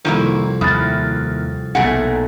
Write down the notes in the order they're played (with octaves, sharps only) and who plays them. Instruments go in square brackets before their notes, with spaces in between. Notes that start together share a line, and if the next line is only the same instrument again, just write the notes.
[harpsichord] C2 F2 [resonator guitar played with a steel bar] D#3 A#3 E4
[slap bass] D#2 [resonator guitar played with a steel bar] E3 [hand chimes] D#6 F6 A6
[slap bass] B1 A#2 [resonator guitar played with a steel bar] A3 G#4 F#5